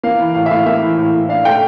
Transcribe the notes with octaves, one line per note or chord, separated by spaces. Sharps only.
A#3 F5
E3
A2 F5
E5
A2 F5
A#3 E5
E3
A2
A2
D4 F5
A3 G5